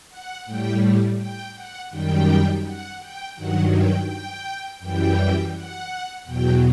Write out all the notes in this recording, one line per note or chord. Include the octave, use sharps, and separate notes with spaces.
F#5
A2 G3 G5
G5
F#5
F#2 D#3 G3 G5
F#5
G5
G2 D#3 F#3 F#5
G5
G5
F#2 E3 G3 G5
F#5
E2 B2 F#3 G5